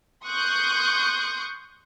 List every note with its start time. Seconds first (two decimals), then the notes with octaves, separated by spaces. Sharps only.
0.24 C6 C#6 D#6 F#6 G6